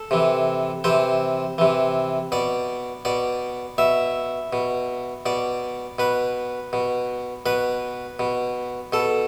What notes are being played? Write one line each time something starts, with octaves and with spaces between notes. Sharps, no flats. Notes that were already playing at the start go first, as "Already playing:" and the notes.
Already playing: A4
C3 E3
C3 E3 C5
C3 E3
B2 D5
B2 D5
B2 E5
B2
B2 D5
B2 B4
B2
B2 B4
B2
B2 A4